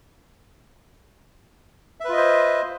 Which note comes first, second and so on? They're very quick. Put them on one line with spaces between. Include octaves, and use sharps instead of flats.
E5 B4 F4 D#5 C5